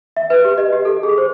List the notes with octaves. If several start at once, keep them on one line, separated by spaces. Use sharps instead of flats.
E5
B4
G4
D#5
G4
A4
G#4
C5